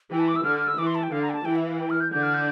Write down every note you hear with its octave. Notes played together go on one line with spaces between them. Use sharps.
E3 G5
A5
D6
E6
D3 F6
F6
E6
E3 D6
C6
A5
G5
D3 F5
A#5
G5
A5
E3 G5
E5
F5
G5
F6
G6
D3 D4 G6
F6
G6